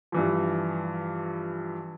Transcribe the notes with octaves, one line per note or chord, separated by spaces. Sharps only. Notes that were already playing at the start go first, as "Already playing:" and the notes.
G2 E3 F3